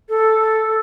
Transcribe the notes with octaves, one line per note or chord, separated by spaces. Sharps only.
A4